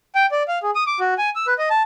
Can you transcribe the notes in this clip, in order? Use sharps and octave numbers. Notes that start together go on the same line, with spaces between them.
G5
D5
F5
G#4
D#6
D6
F#4
G#5
E6
B4
D#5
A5